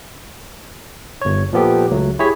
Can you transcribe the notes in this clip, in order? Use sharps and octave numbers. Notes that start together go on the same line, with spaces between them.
G1 C#5
A#2 F3 B3 G4 A4
C#2 F#3 A3
E4 G4 G#4 C#5 B6